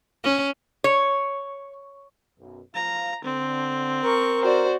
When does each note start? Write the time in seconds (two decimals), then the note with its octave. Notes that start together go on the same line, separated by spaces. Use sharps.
0.24 C#4
0.84 C#5
2.39 B1 F#2
2.75 F3 F5 A#5
3.24 D3 C4
4.04 A#4 C#6
4.42 F#4 C5 D5